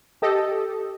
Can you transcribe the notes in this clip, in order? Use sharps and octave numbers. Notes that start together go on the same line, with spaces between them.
G4 A4 D#5